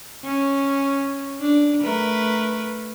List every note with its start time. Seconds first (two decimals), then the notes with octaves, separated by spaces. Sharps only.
0.24 C#4
1.41 D4
1.81 A3 A#4 B4